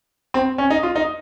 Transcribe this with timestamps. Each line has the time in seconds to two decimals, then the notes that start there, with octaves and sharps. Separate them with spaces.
0.34 C4
0.58 C#4
0.70 D#4
0.83 F4
0.96 D#4